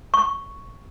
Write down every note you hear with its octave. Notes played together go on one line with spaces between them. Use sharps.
C#6